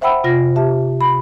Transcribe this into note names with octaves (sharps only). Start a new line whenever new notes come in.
C5 E5 F#5 G5 B5 E6
C3 F4 A#6
G4 E5 A5
B5